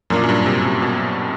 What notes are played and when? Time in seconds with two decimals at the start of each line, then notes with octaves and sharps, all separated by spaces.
0.10 F#2 A#2 F#3 A#3 D4 F4
0.23 F#2
0.29 G2
0.46 C3
0.65 C3
0.82 B2